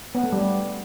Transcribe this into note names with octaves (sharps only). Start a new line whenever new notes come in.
B3
A3
G3